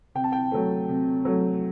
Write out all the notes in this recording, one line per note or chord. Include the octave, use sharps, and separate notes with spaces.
C3 G5
A5
G5
F#3 A3
C3
F#3 A3